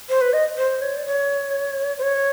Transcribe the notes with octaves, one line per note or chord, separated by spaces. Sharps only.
C5
B4
D#5
C5
C#5
D5
C#5
C5
C#5